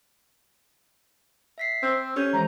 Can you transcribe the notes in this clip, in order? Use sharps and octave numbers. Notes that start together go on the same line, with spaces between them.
E5 B6 C7
C4 C5 E6
C#4 G4 A4 G6
E3 G#3 C5 A#5